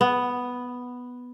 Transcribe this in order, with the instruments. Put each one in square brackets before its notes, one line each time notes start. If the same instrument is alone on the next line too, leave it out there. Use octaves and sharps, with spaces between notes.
[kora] B3